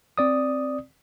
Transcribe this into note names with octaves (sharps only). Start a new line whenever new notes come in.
C4 D5 D#6